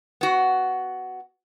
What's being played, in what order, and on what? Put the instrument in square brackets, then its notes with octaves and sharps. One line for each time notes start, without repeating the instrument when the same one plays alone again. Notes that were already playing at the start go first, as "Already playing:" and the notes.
[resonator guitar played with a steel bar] B3 F#4